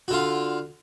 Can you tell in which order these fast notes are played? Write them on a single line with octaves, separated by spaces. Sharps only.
F#4 D3 F4